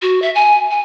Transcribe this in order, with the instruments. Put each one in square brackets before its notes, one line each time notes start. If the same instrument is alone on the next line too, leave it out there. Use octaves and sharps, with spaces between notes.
[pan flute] F#4
E5
G#5
G#5